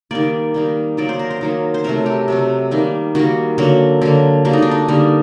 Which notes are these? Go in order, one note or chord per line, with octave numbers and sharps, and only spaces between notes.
D#3 G3 A#3 D5
D#3 G3 A#3
D#3 F#3 A#3 D5
C5
A#4
C5
D#3 F#3 A#3
C5
C3 F#3 A3 A#4
G4
C3 F#3 A3
D#3 G3 A#3
D#3 G3 A#3 F#4
D3 F#3 A#3 F#4
D3 F#3 A#3
D3 G3 A#3 F#4
D#4
D4
D#4
D3 G3 A#3